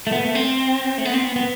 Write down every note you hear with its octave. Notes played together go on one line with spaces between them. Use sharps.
A3
B3
A3
C4
A3
B3
C4
B3
B3